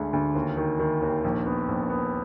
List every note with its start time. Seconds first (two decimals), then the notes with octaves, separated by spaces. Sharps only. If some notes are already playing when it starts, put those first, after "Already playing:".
Already playing: D2 D3 G#3
0.13 D2
0.35 D#2
0.57 D#3
0.79 D#3
1.02 D#2
1.24 A#1
1.46 B3
1.69 A#1
1.90 B3